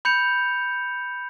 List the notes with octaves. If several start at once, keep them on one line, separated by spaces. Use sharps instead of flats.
B5 G6 C#7 F7